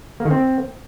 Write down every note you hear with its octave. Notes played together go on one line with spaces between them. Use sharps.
A#3
D#3
C4